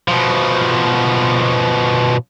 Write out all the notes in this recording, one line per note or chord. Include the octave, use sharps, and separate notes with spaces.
B2 F3